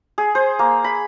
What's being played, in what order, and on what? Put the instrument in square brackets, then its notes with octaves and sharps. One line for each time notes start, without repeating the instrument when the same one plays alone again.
[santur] G#4
C5
A#3
B5